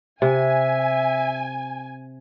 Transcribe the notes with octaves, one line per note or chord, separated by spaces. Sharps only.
C3 E5 G#5